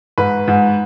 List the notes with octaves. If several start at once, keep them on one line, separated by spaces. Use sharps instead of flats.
G#2 B4
G#2